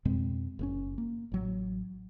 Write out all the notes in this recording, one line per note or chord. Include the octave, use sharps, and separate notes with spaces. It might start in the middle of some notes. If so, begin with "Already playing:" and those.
F2 B2 G#3 C4
F#1 B2 C#4
A#3
A1 F#3